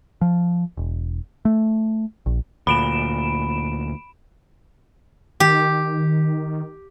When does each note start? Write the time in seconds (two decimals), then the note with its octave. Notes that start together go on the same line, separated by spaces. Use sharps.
0.21 F3
0.77 E1
1.45 A3
2.26 A#1
2.67 D2 A#2 B5 D7 E7
5.40 D#3 G4